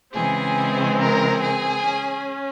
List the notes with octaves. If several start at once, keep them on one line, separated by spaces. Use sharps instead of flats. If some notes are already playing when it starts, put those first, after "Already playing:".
C#3 E3 G#3 C4 G#4 G#5
A#4 A#5
G#4 G#5
C#4